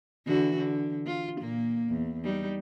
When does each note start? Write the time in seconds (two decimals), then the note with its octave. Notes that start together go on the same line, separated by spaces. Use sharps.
0.26 D3 E3 F#4
0.56 D3
1.06 F4
1.39 A#2 A#3
1.89 E2
2.24 G3 D#4